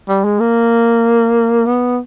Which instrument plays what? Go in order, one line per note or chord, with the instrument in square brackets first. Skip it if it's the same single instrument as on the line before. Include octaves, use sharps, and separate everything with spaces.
[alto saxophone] G3
G#3
A#3
B3